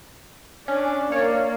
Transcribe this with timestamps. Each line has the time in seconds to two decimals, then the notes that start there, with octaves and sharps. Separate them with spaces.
0.68 C#4 D4
1.12 A#3 C#5 D5